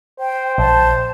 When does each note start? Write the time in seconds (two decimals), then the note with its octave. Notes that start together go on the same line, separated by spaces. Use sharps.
0.20 C5 G5
0.58 A#1 A5